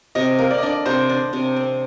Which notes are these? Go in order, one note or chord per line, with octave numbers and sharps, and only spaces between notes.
C3 D#5
A#3
D5
D#5
D4 D5
C3 C5
D4
C3
C4